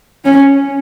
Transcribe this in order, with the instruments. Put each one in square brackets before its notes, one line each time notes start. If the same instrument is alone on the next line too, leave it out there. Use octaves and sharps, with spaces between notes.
[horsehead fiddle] C#4